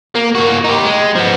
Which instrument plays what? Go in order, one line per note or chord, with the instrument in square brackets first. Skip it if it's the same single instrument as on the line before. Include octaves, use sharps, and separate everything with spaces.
[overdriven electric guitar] A#3
A#3 F#4
D#4 G4
G#3
F3 B3